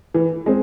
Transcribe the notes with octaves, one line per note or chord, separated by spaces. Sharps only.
E3
G#3 C4